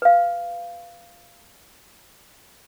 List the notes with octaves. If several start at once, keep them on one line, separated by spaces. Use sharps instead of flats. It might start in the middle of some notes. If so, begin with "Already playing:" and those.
B4 F5